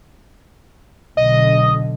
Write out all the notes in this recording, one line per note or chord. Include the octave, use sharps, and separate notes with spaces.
B1 D3 D#5